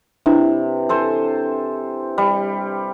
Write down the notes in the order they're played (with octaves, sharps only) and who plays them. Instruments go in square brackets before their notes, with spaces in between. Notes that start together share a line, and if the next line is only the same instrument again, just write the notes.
[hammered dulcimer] C3 [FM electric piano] D4 E4 B4
[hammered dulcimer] A4 C5 G#5
G3